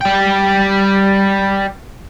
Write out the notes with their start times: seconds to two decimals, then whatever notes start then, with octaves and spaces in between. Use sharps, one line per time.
0.01 G3 G5